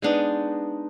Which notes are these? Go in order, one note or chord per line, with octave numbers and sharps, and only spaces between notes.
G#3 B3 D4 D#4